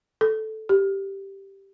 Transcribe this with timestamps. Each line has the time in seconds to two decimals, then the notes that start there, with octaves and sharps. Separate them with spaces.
0.21 A4
0.69 G4